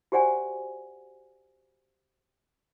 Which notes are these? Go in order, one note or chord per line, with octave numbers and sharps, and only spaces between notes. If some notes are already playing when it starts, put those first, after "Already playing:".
F#4 G4 C5 D5 F#5 G#5